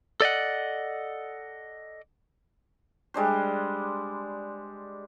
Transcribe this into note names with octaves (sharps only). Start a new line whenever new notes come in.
A4 D5 D#5 F#5
G3 G#3 D4 C5